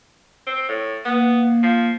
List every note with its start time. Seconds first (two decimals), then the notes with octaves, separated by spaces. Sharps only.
0.47 C4
0.69 A2
1.05 A#3 B3
1.63 F3